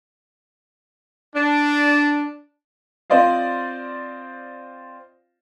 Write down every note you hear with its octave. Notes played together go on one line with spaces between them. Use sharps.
D4
C4 F4 C5 D5 D#5 F5